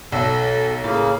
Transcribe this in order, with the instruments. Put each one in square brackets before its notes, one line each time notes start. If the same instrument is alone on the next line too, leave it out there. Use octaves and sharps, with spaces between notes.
[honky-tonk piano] B1 [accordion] A4
[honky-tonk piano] A2 [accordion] C#3 A#3